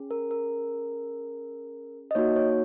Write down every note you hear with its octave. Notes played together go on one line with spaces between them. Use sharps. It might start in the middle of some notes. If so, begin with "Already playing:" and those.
Already playing: C#4 G#4
A#4
A#4
D#5
A#3 D#4 F#4 C#5
C#5